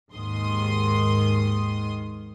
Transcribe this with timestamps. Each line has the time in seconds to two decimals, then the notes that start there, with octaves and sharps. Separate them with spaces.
0.12 D#2 G#2 D#3 C6 D#6